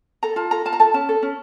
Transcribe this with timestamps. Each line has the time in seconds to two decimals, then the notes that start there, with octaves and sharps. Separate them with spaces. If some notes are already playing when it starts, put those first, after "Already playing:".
0.23 A4 A#5
0.36 F4 A5
0.51 A4 A#5
0.65 F4 A5
0.73 A#5
0.80 A4 A5
0.94 C#4 A5
1.09 A4
1.23 C#4